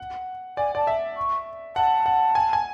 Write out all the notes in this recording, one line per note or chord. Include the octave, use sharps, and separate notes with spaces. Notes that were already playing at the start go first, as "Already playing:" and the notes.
Already playing: F#5
D5 G#5
D5 A5
E5
C#6
F#5 A5
F#5
G#5
G#5